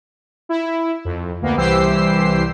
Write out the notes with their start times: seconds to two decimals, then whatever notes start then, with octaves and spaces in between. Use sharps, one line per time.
0.49 E4
1.05 F2
1.41 D2 A#3 B3
1.57 C2 E3 G4 C5 E6 C7